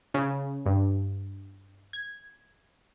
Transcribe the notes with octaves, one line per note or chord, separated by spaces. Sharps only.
C#3
G2
G#6